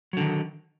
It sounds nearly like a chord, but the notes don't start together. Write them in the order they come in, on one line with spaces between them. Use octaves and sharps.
F#3 D3 D#3